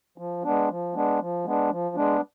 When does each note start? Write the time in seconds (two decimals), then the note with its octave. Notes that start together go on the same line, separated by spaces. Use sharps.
0.18 F3
0.44 G#3 B3 D4
0.69 F3
0.94 G#3 B3 D4
1.20 F3
1.45 G#3 B3 D4
1.71 F3
1.96 G#3 B3 D4